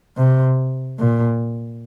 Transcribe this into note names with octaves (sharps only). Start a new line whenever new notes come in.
C3
A#2